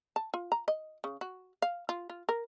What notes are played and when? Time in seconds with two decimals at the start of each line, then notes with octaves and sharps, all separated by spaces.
0.16 A5
0.34 F4
0.52 A#5
0.68 D#5
1.04 C#3
1.21 F#4
1.62 F5
1.89 F4
2.10 F4
2.29 A#4